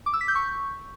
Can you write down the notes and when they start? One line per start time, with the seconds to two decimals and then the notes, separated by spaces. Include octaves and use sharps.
0.06 D6
0.14 E6
0.21 B6
0.28 G6
0.35 C#6